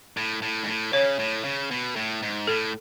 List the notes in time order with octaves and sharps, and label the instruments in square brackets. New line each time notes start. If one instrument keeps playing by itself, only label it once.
[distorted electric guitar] A2
A2
G#2
A2
[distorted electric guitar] C#3 [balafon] C#5
[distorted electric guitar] A2
C#3
B2
A2
G#2
[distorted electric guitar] A2 [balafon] A4